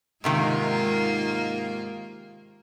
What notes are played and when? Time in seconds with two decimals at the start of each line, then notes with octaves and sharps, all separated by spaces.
0.24 G#2 C3 D#3 G#3 A#3 F4